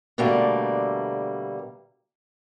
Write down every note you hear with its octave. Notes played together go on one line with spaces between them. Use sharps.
B2 D3 G3 A3 A#3